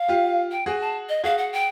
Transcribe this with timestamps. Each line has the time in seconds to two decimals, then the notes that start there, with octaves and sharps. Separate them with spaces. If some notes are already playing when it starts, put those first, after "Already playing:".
Already playing: F5
0.08 F4 G4
0.51 G5
0.66 F#4 G#4 G#5
0.81 A5
1.09 D#5
1.24 F#4 G#4 F5
1.38 F#5
1.53 G5